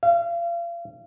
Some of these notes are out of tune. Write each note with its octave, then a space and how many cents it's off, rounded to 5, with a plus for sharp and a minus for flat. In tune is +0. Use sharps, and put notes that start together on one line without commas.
F5 -35